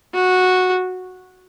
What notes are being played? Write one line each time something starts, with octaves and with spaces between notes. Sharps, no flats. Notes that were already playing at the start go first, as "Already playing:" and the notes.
F#4